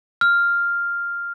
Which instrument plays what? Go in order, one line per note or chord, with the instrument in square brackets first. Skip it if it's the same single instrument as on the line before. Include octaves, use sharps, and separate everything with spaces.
[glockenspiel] F6